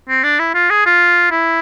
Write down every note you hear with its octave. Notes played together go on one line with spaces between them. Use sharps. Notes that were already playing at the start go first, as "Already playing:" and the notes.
C4
D4
E4
F4
G#4
F4
E4